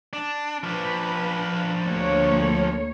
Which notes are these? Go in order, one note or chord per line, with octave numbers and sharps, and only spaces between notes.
D4
F3 D4 B4
D2 A#3 C#5